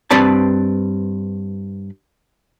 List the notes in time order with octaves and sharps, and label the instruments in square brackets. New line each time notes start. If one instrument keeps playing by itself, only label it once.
[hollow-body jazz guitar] G2 C4 B4 D5 A5